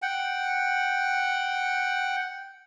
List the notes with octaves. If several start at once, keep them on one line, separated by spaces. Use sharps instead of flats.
F#5 G5